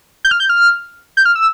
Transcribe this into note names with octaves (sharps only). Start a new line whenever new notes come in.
G6
F6
G6
F6
G6
F6
E6